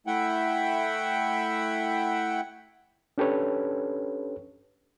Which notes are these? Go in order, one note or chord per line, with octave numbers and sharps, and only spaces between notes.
A3 E4 E5 F#5 G5
C#4 D4 G4 A4 B4 C#5